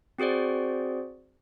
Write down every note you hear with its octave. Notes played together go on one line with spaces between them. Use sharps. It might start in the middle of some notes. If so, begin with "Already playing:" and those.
C4 F#4 G#4 C5 D5